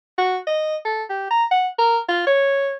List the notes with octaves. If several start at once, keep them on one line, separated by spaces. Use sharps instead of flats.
F#4
D#5
A4
G4
A#5
F#5
A#4
F4
C#5